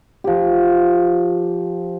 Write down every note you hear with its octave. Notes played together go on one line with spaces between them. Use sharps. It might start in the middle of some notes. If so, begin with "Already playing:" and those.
F3 G4